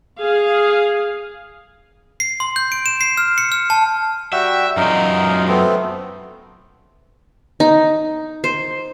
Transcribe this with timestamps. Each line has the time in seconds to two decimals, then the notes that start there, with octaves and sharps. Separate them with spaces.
0.19 G#4 F5
2.20 C7
2.40 C6
2.56 G6
2.72 D7
2.86 E7
3.01 C7
3.17 F6
3.38 C#7
3.52 F6
3.70 A5
4.33 G3 F#4 E5 G5
4.77 F#2 D#4 F4 A#4
5.48 A3 B3 C4
7.60 D#4
8.44 C5